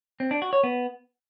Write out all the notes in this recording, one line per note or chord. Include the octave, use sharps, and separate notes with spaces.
C4
D4
F#4
C#5
B3